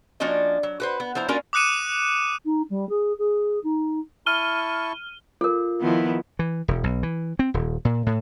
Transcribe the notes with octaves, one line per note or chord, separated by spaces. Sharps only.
F3 A#3 C#4 D4 F#4 D#5
F#3
F#4 B4 C5
B3
F3 E4 C5 A#5
A#3 C#4 D4 F4 F#4 A#4
D6 D#6 F#6 C#7 D#7 E7
D#4
G3
G#4
G#4
D#4
E4 A5 C#6 F6 D#7 G7
F4 A4 A#4
D#3 F3 B3 E4
E3
E1
B1
E3
C4
D#1
A#2
A2